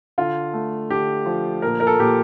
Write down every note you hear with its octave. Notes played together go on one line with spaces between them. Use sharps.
D3 F4
A3
D3 G4
F3
A#2 A#4
A#4
A4
A#2 G4